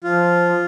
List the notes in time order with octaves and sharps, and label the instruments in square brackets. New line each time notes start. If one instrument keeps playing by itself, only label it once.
[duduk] F3 [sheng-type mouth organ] F4